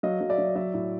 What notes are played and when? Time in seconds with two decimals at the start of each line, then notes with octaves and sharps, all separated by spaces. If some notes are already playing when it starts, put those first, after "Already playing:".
0.03 F#3 D#5 F5
0.21 F#3
0.29 D5 E5
0.38 F#3
0.56 F#3 D5 E5
0.74 A2